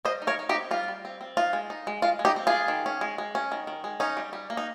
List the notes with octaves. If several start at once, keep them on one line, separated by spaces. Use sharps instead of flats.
G3 C5 D#5
D#4
A#4 C#5
D#4
D#4 G4
C4
G3 F4
G3
C4
C4
D#4 F4
G#3
D#4
G#3
G#3 F4
G#3
D#4 G4
C4
G#3 F4 G#4
D#3
C#4
G#3
G#3
C#4
D#3
D#3
G#3
C#4 D#4
G3
G3
A#3
D#4